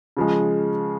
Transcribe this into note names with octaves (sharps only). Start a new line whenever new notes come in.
C#3 F3 G#3